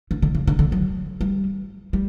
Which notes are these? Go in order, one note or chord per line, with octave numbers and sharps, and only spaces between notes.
D3
D3
C#3
D3
D3
F#3
G3
G3